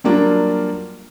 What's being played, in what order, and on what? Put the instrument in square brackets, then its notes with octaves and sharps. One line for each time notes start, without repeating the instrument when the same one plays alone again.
[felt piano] F#3 G3 A#3 D4 F4